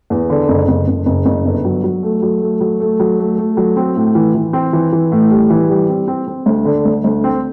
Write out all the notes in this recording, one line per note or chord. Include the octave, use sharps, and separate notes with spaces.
E2
D3
F#1
F#1
F#1
F#1
F#1
G1
F#3
F#3
A3
F#3
A3
F#3
A3
F#3
A3
A3
F#3
C4
A2
E3
E3
C4
E3
E3
A2
G3
E3
G3
C4
C4
C4
D2
D3
D2
D2
C4